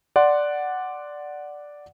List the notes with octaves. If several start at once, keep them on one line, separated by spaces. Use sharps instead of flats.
D5 F#5 C6